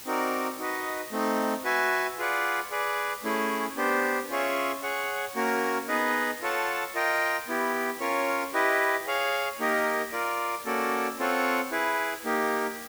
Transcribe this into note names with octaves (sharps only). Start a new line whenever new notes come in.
C4 D#4 F#4 A#4 D5
D#4 F#4 B4 D#5
A3 C4 D#4
F#4 B4 E5 G#5
F4 G#4 B4 D5 F#5
G#4 B4 D5
A3 C#4 E4 G#4
B3 D4 G4 C5
C#4 F4 G#4 C#5 E5
G#4 C#5 F#5
A#3 C#4 F#4 A#4
B3 D#4 G#4 B4 D#5
F4 A4 C#5 F#5 A5
F4 A#4 D#5 G5
B3 E4 G4
C#4 F4 A#4 C#5
E4 G4 B4 D#5
G#4 C#5 F5
A#3 D#4 G4 A#4 D#5
F4 A#4 D5
A#3 C#4 F#4 A4 D5
C4 F4 A4 C#5 F#5
E4 G#4 B4
A#3 D#4 G4